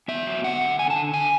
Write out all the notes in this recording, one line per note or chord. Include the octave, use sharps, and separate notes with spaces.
B3 E5
F#3
D3 F#5
D3
D3 G#5
A5
D3
D3 G#5